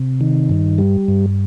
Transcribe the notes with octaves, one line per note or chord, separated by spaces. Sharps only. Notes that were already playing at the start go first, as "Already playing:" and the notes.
Already playing: C3
D#3
G2
G3
G2